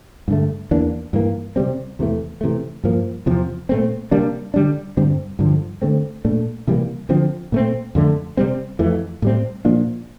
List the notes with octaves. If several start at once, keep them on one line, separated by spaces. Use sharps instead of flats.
G2 D3 A3
E2 E3 A#3 D4
G2 E3 A#3
C3 G3 C4
E2 C3 E3 A3
C3 E3 A3
G2 F3 A#3
E2 C3 F3
A#2 A3 C4
C3 G3 A#3 D4
D3 G3 D4
G2 D3 G3 C4
G2 D3 F3
D3 A3 C4
A#2 A3 D4
C3 E3 G3 A#3
D3 F3 C4
A#2 A3 C4
F2 D3 A3
C3 G3 C4
F2 E3 A3
A2 G3 C4
A#2 F3 A#3 D4